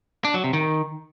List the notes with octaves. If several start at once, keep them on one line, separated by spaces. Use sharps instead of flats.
D4
F#3
C3
D#3